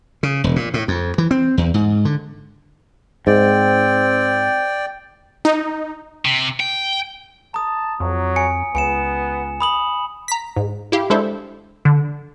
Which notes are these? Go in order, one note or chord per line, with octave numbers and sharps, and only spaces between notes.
C#3
E1
A#2
A2
F2
E3
C4
E2
G#2
D3
G#2 C4 D5 G5
D#4
C3
G5
A5 A#5 D#6
F2 F#3
G#5 C#7
C#2 B3 G#5 C#7 E7
B5 D#6 F#7
A#5 B6
G#2
E4 G4 F5
G#3 D4 E4 A4 C5 E5
D3